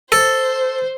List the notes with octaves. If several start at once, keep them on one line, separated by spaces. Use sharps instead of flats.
A4 C5